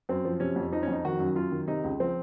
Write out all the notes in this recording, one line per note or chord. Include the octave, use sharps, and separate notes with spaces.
F#2 C4
F3
C3 C#4
F2
F3 D#4
C#4
F2 D#4
D#3 F#4
F#2
F#2 F4
D#3
C3 D#4
C#2
F3 C4